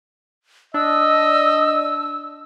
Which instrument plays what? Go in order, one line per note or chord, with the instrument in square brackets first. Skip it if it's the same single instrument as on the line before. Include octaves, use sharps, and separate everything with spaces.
[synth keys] D4 [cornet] D#5 [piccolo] E6